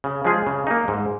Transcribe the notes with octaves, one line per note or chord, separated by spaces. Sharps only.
C#3
F3 G#3 F4 G#4
C#3
A#3 D#4
G#2